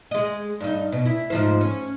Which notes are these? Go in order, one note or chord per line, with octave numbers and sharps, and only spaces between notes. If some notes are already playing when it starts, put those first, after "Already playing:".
G#3 D#5
G2 D#4
B2
E4
G#2 F3 C5
C#4